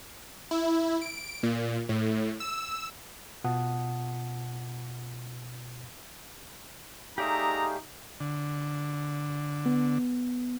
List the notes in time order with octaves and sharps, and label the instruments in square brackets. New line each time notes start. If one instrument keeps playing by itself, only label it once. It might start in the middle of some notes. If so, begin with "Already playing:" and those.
[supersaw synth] E4
D7
A#2
A2
E6
[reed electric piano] B2 F4 F#5 A5 D#6
[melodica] A3 G#4 F5 [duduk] D#4 [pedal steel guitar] G4 D5 E5 [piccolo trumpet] A#5
[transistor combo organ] D3
[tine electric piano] B3